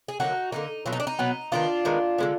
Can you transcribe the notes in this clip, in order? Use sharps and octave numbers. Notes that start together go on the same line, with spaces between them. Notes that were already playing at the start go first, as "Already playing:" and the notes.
G#4
D3 F#3 A#3 D#4 F#4
D3 F#3 A#3 D#4
B2 F#3 B3 F4
D#4
D4
D#4
B2 F#3 B3
D#3 G#3 B3 D4 F4
D#3 G#3 B3
D3 G#3 B3